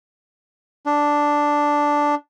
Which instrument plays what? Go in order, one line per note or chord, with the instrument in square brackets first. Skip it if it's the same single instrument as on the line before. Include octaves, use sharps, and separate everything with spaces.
[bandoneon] D4